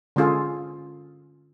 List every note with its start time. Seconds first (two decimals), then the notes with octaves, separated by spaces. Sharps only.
0.16 D3 G#3 C#4 F4 G#4 A4